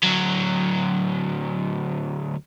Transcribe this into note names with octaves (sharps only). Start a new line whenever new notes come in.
D2 F#3